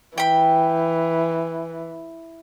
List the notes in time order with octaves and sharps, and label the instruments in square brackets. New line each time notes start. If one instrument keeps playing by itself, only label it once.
[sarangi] E3 [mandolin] G5 B5